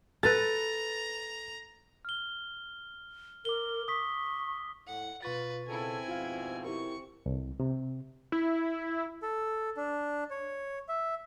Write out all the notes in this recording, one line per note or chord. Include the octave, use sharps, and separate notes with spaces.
A4 B4 A#5 A6
F6 G7
A#4 D6 G7
C#6 D#6 B6
A2 F#5
B2 F4 B4 C#6 A6
C#3 C4 E4 F4 A4 G#5
F2 G#2 B2 F4 F5
E4 G4 A#4 C#6
C2
C3
E4
A4
D4
C#5
E5